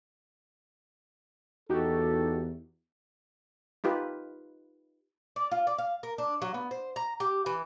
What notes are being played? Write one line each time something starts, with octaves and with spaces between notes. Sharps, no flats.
E2 D#4 F#4 G4 A4
D#4 F4 G4 B4
D5
F4
D5
F5
A#4
D4
F#3
B3
C5
A#5
G4
E3